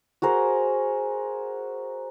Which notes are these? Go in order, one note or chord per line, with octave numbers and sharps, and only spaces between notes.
F#4 G#4 A#4 C5